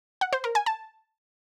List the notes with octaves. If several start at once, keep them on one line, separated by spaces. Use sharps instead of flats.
F#5
C5
A#4
G#5
A5